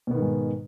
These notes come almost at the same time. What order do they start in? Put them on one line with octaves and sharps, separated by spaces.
B2 B3 D#3 G#2 G#3